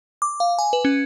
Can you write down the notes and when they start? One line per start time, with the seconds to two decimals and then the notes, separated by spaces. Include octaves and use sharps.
0.22 D6
0.40 F5
0.59 G#5
0.73 B4
0.85 C#4